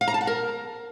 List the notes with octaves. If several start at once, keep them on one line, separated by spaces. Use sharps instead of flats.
F5
A#5
A5
F#5
A#4